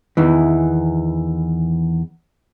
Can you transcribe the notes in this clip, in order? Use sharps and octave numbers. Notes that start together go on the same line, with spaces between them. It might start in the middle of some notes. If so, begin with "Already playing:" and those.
E2 D#3 E3